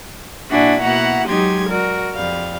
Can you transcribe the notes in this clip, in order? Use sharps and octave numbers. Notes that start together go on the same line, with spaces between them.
A#2 D4 E4 F#4 D5 G#5
B2 A#3 E4 F#4 F#5 A#5
F#3 G#3 D#4 G4 C6 G#6
F#4 A#4 D5
F2 G3 F5